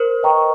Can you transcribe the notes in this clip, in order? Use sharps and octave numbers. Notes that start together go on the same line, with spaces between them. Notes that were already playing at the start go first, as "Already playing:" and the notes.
Already playing: A#4 C5
B4 D#5 G5 A#5 C#6